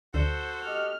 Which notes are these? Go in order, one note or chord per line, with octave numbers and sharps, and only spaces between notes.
D2 D3 F#4 A4 C5
G4 D#5 F6